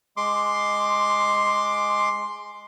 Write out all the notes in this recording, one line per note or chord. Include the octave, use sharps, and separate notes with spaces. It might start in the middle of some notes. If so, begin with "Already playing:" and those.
G#3 C6 D6